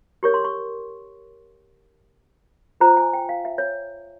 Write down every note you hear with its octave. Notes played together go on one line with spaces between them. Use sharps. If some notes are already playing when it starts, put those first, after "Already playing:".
G4 A#4 C#5 C#6
C6
C#6
F4 G#4 C5 A#5
G#5
G5
F5
E5
C#5